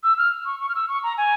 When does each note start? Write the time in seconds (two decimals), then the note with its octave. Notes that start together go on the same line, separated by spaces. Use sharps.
0.03 E6
0.18 F6
0.46 C#6
0.60 C#6
0.69 F6
0.75 E6
0.89 C#6
1.03 A#5
1.17 G#5